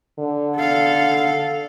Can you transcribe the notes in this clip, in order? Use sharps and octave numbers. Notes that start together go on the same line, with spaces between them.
D3
A4 F5